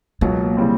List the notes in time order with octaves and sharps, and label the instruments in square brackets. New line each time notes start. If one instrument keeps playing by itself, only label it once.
[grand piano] C#2 B2 F#3 [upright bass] A#3
[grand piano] C#3 E3 G3 C4